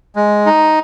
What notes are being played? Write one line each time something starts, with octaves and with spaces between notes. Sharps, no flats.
G#3
D#4